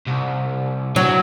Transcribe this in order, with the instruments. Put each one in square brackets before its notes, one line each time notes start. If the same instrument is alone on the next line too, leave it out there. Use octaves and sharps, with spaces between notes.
[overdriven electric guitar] C2
[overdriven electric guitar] E3 D4 [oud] F#3